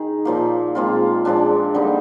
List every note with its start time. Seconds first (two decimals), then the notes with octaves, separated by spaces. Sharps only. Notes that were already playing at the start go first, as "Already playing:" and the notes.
Already playing: D#3 D#4 G#4
0.25 A#2 F3 A#3
0.75 A#2 G#3 C4 F4
1.25 A#2 F3 G#3 D4
1.74 D3 G3 A#3 D#4